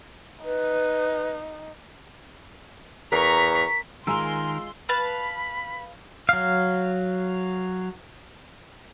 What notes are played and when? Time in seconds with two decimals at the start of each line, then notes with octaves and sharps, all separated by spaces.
0.45 D#4 B4
3.12 E2 A#4 A#5 C#6 B6
4.07 D#3 G#3 F4 A#4 G#5 A#5 C6 E6
4.89 B4 F5 A5 B5
6.29 F#3 F5